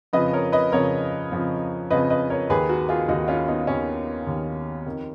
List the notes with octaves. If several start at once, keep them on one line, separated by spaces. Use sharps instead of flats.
F2 C#3 F3 B4 D#5
A#4 C#5
B4 D#5
F2 C#3 F3 A#4 C#5
F2 C#3 F3
F2 C#3 F3 B4 D#5
B4 D#5
A#4 C#5
D#2 D#3 G#4 B4
F#4 A#4
F4 G#4
D#2 D#3 D#4 F#4
C#4 F4
B3 D#4
D#2 D#3 C#4
D#2 D#3
F2 D#3